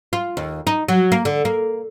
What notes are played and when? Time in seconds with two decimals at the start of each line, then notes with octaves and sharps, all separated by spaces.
0.13 F4
0.37 D#2
0.67 D#4
0.88 F#3
1.12 A#3
1.25 D3
1.45 A#3